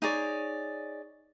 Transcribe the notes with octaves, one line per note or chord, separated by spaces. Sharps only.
D#4 G#4 C#5 D5